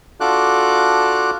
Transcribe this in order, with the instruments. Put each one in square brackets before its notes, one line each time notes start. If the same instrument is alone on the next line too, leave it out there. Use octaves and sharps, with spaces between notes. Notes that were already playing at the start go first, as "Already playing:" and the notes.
[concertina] D4 F4 F#4 A4 D6 F#6